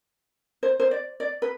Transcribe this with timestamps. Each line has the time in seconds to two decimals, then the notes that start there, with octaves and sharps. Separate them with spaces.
0.63 C5
0.80 C5
0.91 D5
1.20 D5
1.42 B4